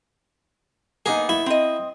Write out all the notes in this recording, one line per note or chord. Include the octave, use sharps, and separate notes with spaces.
A#3 B3 D#4 G#4
E4
C4 D#5